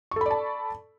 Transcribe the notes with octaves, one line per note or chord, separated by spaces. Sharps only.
A4 D5 A5 B5 C#6